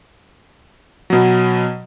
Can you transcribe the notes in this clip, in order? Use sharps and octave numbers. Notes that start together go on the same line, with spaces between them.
B2 F#3